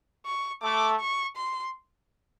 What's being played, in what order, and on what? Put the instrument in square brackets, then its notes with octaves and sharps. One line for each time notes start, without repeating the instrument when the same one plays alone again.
[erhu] C#6
[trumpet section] A3 [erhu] D6
[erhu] C#6
C6